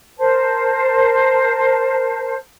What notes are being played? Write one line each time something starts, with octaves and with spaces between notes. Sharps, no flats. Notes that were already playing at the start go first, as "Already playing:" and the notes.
A#4 C5 A5